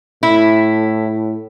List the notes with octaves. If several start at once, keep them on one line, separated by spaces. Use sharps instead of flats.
A2 E4